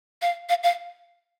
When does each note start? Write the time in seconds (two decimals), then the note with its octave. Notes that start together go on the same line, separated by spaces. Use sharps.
0.22 F5
0.49 F5
0.63 F5